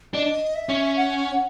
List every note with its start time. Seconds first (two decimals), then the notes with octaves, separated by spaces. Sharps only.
0.14 D4 D#5
0.55 E5
0.69 C#4
0.97 F#5